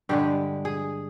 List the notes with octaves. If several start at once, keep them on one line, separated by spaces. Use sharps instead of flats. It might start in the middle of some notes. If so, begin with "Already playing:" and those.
G2 D3 G#3 G4
G#4